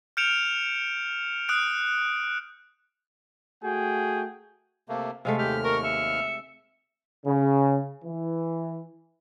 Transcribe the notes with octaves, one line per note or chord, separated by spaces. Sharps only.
F6 G6 C#7 D7 E7 F7
D#6 F#6 D7
A3 F#4 G#4 G5
C3 A3 A#3
C3 G#3 A3 F5
D#2 G4 F6 B6
A#4 C#6
E5 C#7
C#3
E3